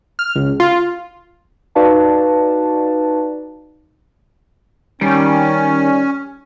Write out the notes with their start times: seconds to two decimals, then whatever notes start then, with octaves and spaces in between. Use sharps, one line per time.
0.19 F6
0.35 C#2
0.60 F4
1.75 D#4 F#4 B4 D5 F5 A5
5.01 D#3 G3 C#4